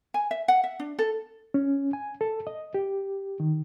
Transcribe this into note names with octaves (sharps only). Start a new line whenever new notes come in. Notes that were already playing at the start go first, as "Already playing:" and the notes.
G#5
E5
F#5
E5
D4
A4
C#4
G#5
A4
D#5
G4
D#3